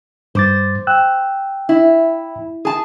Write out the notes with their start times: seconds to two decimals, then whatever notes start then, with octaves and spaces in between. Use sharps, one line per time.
0.35 G2 C5 D6 A6
0.87 G5 E6 F#6
1.69 E4
2.65 G#4 A5